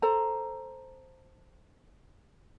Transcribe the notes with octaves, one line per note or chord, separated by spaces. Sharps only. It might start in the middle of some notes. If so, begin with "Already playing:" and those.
A4 C5 A#5